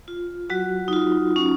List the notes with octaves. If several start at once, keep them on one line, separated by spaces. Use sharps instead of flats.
F4
F#3 F#4
D#4
F4
C#4